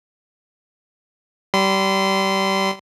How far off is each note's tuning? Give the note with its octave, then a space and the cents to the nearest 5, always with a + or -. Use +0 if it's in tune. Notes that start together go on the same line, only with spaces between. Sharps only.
G3 -25 C6 -30